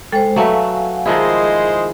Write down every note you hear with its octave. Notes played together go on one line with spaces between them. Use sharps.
G#3 A4 C5 G5
F#3 A3 B4 F5 F#5 G#5
D#3 F3 G#3 E4 G#4 C5 D#5